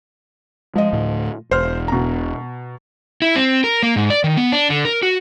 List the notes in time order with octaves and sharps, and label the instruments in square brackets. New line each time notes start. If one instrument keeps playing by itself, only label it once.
[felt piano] F3 D#5 [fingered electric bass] G#3
[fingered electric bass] D2 A2
[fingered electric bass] E1 [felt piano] C5 F6
[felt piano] B2 A#5
[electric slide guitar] E4
C4
A#4
A#3
G#2
D5
D#3
B3
D4
D3
A#4
F#4